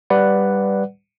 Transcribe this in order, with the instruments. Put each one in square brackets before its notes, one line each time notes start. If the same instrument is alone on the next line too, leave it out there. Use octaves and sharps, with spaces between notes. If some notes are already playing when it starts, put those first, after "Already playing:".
[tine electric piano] G3 B4 D5 F#5